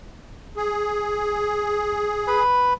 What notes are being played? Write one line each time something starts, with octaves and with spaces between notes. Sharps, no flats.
G#4
B4 B5